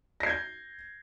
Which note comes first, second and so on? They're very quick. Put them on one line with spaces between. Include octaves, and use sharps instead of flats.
A#6 C7 G#6 G6